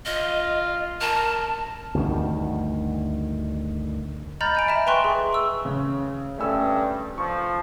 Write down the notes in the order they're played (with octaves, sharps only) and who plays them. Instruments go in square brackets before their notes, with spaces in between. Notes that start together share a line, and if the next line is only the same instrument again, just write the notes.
[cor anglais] F4 [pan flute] D#5
[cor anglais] A#4 [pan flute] A5
[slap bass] D2 G2 D#3
[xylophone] D#5 A#5 B5 F6 G6 A6
D#5 G#5 D7
E5 A#5 E7
B4 G5 G#5 C6 C#6 F#6
G#4
C#6 E6
[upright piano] C#3
[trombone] G2 [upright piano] A3 C#4 E6
[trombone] F3 [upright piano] C#6